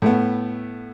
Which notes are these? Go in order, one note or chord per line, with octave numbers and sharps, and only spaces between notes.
A2 A3 B3